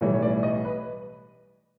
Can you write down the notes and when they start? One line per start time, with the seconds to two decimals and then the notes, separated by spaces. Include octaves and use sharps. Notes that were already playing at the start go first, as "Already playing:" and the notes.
0.01 B1 A2 E3 G3 C#5
0.14 C#5
0.22 D5
0.43 D#5
0.65 B4